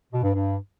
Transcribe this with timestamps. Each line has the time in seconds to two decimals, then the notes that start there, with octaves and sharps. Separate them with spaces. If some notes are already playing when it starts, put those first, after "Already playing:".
0.13 B2
0.23 G2
0.34 G2